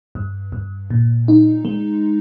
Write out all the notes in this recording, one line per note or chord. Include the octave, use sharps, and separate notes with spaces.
G2
G2
A#2
D#4
G#3